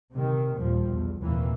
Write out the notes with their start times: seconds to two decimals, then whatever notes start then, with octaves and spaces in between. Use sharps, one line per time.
0.13 C3 D#3
0.56 D#2 A#2 F3 G3
0.87 B1 E2
1.23 F1 D#2 A#2 E3 A#3